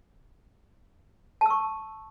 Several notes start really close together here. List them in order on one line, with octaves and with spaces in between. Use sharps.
A5 E6 C#6